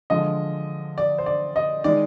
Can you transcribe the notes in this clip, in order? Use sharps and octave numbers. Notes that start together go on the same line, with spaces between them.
D3 F3 G#3 D#5
D5
C5
D5
D#5
D#3 G#3 D5